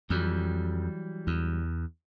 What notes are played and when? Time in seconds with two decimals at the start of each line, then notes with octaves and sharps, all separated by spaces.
0.10 F2 E3 F#3 G3
1.27 E2